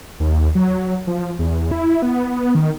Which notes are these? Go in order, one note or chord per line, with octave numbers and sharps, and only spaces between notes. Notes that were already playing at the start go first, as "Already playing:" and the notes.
D#2
F#3
F3
E2
E4
B3
D#3